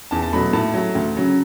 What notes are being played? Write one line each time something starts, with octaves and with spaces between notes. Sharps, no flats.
E2 A5
A5
B2 F#3 A3 B5
A2 A5
F#3 A3
D2
C#3 F#3